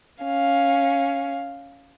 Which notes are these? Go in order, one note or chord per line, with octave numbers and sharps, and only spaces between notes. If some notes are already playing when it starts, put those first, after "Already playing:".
C#4 F5